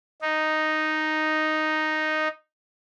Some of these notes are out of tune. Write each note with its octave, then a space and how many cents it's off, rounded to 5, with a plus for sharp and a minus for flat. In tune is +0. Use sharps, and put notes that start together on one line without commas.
D#4 -5